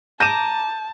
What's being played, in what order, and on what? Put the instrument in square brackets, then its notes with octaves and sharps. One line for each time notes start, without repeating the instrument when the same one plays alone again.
[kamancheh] A5 [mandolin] A#5 D6 [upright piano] G6 D#7 E7